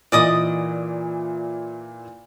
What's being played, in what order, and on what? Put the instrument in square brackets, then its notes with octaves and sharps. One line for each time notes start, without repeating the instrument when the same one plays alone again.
[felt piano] A#2 E3 [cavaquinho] D5 D#5 D#6